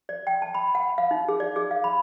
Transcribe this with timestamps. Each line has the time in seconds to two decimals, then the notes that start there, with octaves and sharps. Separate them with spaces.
0.09 D5
0.27 G5
0.42 A5
0.55 B5
0.75 F#5
0.98 F5
1.11 D#4
1.28 G#4
1.40 D5
1.56 G#4
1.71 F5
1.84 B5